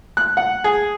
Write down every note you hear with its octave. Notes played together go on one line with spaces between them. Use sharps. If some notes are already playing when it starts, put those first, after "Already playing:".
F#6
F#5
G#4